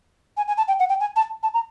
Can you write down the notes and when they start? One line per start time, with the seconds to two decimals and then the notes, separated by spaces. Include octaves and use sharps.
0.37 G#5
0.47 G#5
0.57 A5
0.67 G5
0.79 F#5
0.89 G5
1.00 G#5
1.16 A5
1.43 A5
1.53 A#5